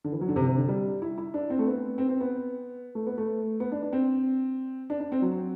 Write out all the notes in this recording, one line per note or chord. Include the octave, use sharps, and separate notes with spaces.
D3
E3
F#3
D3
C3
C3
D3
G3
E4
E4
D4
C4
A3
B3
C4
C4
B3
A3
B3
A3
B3
D4
D4
C4
D4
D4
C4
F#3